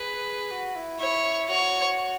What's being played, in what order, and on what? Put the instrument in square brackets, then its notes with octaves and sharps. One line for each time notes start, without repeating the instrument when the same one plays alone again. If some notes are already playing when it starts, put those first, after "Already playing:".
Already playing: [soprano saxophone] G#4 [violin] B4
[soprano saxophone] F#4
E4
[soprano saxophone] E4 [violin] C#5
[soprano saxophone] F#4 [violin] C#5